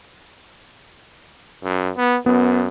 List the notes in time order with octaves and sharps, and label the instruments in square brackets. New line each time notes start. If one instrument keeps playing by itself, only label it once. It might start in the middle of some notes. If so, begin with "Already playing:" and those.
[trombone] F#2
B3
[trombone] F#2 [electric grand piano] B3